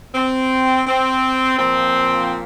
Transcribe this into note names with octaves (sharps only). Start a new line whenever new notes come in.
C4
C4
A#2 F3 C4